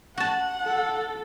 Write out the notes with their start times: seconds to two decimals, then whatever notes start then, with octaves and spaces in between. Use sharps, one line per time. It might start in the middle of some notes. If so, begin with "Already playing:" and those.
0.18 F#4 F#5 A5
0.62 A4